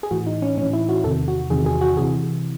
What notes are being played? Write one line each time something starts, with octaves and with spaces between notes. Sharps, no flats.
G#4
A2 E3 F#4
D#4
C#4
A2 E3 C#4
E4
F#4
E2 C3 D#3 A4
F#4
E2 C3 D#3 G#4
G#4
F#4
C3 E3 G#4